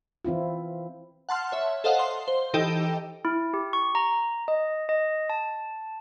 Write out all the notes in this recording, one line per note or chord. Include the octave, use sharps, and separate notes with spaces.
E3 C4 E4 F4
F#5 A5 C6 F6
C#5 E5
A4 C5 D#5 F5 F#5
C6
C5
E3 D#4 G4 A4 D#5 G5
E4
G4
C#6
A#5
D#5
D#5
A5